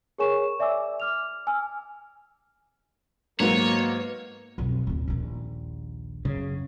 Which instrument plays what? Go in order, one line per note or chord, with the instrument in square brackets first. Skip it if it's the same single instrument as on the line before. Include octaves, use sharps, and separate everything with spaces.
[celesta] G#4 A#4 C#5 G#5 C#6 E7
D5 E5 G#5 D6 E6
D6 F6 F7
G#5 E6 F6
[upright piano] G#2 F#3 [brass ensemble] A#3 [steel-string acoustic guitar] B3 A#5 [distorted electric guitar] C#5
[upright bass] B1 F2
D1 C#3
A#1 D#2
[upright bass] F#2 [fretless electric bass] C#3